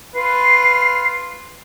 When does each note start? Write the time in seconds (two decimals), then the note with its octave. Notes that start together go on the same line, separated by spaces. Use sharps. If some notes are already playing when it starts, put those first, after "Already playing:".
0.16 F4 B4 C7